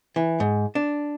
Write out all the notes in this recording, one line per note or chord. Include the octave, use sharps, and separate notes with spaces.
E3
G#2
D4